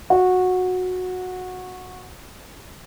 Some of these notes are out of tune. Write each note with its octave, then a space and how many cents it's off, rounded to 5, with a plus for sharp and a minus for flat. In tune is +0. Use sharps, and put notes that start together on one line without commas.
F#4 -15